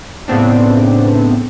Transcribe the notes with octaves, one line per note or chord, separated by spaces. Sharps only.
A2 C#3 B3 C4 D4